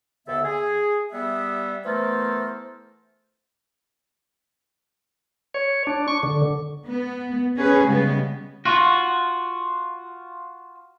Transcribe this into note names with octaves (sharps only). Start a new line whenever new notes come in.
D#2 D3 B3 A4 E5
G#4
G3 B3 E5
E3 A3 B3 A4 A#4 C5
C#5
D4
C#6
D3
B3
C#4 G#4 B4
C#3 G3 G#3 B3
F4 F#4